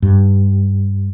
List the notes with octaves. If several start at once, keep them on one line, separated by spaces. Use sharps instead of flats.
G2